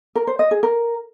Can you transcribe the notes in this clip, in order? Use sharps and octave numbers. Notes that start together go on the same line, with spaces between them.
A#4
C5
D#5
G#4
A#4